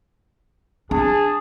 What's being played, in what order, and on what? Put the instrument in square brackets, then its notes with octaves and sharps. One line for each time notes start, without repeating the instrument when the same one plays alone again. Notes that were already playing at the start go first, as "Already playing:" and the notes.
[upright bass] D4 [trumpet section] G#4 A5